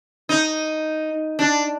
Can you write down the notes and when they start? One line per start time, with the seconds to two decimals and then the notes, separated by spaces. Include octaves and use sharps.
0.29 D#4
1.39 D4